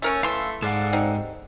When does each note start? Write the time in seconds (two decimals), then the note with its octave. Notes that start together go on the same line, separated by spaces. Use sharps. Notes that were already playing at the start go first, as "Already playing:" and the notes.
0.02 A3 C#4 A#4 C#5
0.23 E3 A3 F5 C6 E6
0.62 G#2 A4 D5 F5 F#5
0.93 G3 C4 D#4